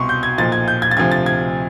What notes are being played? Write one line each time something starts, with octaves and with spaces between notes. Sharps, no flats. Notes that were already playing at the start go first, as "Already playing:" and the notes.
Already playing: C2 B2 C6 C#6
G6
G#6
B1 A#2 F3 A6
G#6
G6
G#6
A6
D2 C3 F3 G#6
A6
G#6